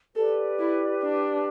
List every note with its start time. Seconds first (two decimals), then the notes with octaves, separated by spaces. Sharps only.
0.15 G4 A4 B4 D5
0.59 E4
1.02 D4